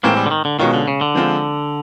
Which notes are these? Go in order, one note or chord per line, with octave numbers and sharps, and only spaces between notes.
A2 E3 G#3 A#3 C4
G3
D3
D#3
D3
B2 D#3 G#3 C#4 F4
D3
C#3
D3
F3 G#3 C4 F4